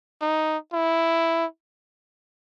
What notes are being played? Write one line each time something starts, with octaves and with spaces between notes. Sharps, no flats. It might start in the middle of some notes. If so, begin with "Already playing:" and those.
D#4
E4